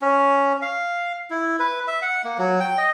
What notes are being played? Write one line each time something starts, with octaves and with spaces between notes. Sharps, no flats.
C#4
F5
E4
B4
E5
F#5
A#3
F#3
G5
D#5